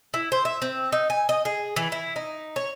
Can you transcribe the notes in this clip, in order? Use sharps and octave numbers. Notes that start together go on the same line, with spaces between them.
E4
C5
E5
C4
D#4
G#5
D#5
G#4
E3
E4
D#4
C#5